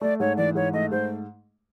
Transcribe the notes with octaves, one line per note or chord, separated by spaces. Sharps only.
A3 D5
G#2 C#5
E3 D5
G#2 C#5
A3 D#5
G#2 C5